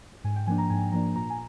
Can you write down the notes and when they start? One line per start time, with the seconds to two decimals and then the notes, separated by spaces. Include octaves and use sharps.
0.24 G#2 G#5
0.36 G5
0.47 F3 A#3 D4 G#5
0.58 A#5
0.70 G#2 G#5
0.92 F3 A#3 D4 A#5
1.15 A#2 A#5
1.30 G#5